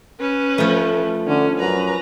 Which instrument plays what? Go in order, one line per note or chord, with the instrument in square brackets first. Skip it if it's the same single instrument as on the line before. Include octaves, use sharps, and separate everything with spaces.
[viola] C#4 B4
[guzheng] F3 A3
[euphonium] D3 [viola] C#4
[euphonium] F#2 [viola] B4 A#5